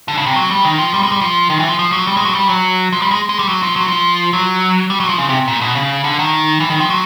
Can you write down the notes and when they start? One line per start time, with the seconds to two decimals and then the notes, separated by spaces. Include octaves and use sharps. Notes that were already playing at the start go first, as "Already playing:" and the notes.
0.08 D3
0.17 C#3
0.26 C3
0.36 F#3
0.51 G3
0.64 D#3
0.78 F3
0.94 G3
1.03 G#3
1.12 G3
1.21 F3
1.50 D#3
1.59 E3
1.69 F3
1.79 F3
1.93 F#3
2.07 G3
2.17 G#3
2.25 F#3
2.35 G3
2.49 F#3
2.92 F3
3.02 G3
3.11 G#3
3.29 G#3
3.39 G3
3.49 F#3
3.63 F3
3.76 F#3
3.88 F3
4.33 F#3
4.90 G3
5.00 F#3
5.09 F3
5.18 C#3
5.29 C3
5.48 A#2
5.61 B2
5.75 C#3
6.04 D3
6.19 D#3
6.60 E3
6.70 D#3
6.80 F3
6.90 F#3